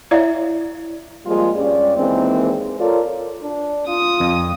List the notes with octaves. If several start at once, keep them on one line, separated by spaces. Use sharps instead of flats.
E4 C#5 D5 E5 F5
F3 G3 G#3 A#3 F4
G2 C#4 D5
D#2 D#3 E3 G#3 C4
F4 A4 A#4 C#5 D5
D4
F4 D#6
F2